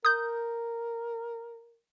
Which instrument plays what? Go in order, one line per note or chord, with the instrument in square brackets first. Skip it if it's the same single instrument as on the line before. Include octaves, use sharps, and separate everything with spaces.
[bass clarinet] A#4 [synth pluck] D#6 G6